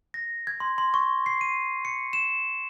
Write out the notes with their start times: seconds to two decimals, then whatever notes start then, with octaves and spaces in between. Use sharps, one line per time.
0.14 A#6
0.47 G#6
0.60 C6
0.78 C6
0.94 C#6
1.26 C7
1.41 D#7
1.85 C#7
2.13 E7